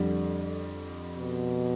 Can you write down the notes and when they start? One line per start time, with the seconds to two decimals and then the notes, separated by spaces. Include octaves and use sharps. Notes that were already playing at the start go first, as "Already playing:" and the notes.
Already playing: F2 D3 G3
1.18 B2